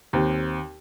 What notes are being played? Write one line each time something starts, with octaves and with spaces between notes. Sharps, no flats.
D#2 C4